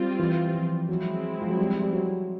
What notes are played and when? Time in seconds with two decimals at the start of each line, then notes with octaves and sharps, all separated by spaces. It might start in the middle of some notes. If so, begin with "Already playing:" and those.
Already playing: G3 C4 F4
0.19 E3
0.54 F3
0.89 F#3 G#3 C4 E4
1.42 F3
1.50 F#3
1.59 G3
1.82 G3
1.93 F#3